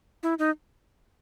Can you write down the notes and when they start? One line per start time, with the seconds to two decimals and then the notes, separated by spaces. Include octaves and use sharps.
0.23 E4
0.39 D#4